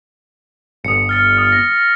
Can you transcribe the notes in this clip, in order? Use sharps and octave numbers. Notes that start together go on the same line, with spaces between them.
G1 D#6 C#7
F6 A6 C#7
D#6 F6
A#6